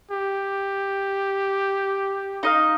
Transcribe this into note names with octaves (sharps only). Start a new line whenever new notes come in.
G4
D#4 D#5 F5